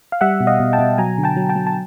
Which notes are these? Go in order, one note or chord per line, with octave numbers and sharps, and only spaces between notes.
F5
G3 E5 F#5
B2
D#5 F5
B2
G5 A5
B2
F#3 G#5 A#5
D3
G5 A5
F#3
G5 A5
F#3
A5